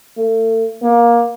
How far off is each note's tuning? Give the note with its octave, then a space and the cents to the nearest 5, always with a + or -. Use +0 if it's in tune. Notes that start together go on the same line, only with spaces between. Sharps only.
A3 +35
A#3 +15